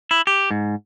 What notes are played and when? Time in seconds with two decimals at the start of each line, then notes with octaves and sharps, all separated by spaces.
0.11 E4
0.27 G4
0.51 G#2